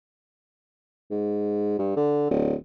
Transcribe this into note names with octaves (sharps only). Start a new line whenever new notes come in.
G#2
G2
D3
D1